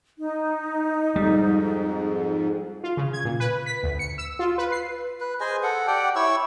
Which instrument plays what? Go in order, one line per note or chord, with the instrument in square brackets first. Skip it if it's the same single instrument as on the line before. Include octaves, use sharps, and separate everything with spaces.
[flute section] D#4
[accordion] F2 G#2 [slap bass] G3
[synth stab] F4
C#3
G#6
A#2
B4
B6
D2
C#7
E6
F4
B4
C7
[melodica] B4
G#4 C5 D#5 G#5
A4 F#5
G4 D5 F#5 G5
E4 C#5 C#6 E6